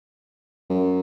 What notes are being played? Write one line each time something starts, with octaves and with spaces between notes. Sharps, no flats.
F#2